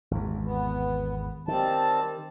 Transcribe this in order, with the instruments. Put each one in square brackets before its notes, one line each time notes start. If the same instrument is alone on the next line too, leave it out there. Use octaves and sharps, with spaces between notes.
[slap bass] G#1 E2
[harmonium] B3
[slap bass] D#3 [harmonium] G3 C4 A5